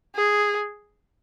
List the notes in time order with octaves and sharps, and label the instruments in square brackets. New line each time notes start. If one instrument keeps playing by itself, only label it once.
[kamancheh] G#4